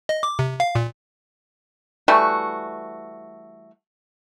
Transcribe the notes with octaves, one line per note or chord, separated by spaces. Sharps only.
D#5
D6
C3
F5
A#2
E3 G3 A3 F#4